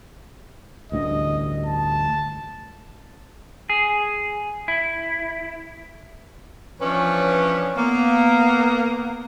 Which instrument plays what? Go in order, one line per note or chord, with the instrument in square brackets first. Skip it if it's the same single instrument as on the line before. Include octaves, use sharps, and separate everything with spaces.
[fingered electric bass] A1 D2 G2 [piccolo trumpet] D#5
[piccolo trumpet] A5
[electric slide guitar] G#4
E4
[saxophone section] E3 F3 C#4 D4 B4 C#5
A#3 B3